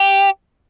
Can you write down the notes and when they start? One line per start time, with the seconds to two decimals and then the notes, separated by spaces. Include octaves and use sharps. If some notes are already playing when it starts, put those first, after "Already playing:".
Already playing: G4